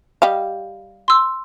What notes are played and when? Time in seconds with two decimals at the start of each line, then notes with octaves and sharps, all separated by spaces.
0.22 G3 D#5 F5
1.08 C6 E6